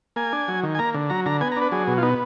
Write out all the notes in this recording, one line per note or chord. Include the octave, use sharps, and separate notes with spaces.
A#3 G#5
D4
F#3
D#3
G#5
A#3 A#5
D3
F#3 A#5
D3 A#5
B3 G#5
A#5
D4 B4
F#3 G#4
B2
F4
B3 D#4